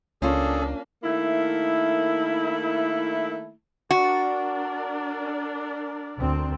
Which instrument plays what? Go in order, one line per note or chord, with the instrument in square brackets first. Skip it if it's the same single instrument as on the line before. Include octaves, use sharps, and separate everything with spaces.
[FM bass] C#2 [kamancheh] A#3 D4 [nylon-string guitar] C#4 F4 [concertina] G#4 A4
[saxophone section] D#3 A3 A#3 E4
[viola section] D4 A#4 D5 [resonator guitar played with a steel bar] F#4
[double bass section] D2 C4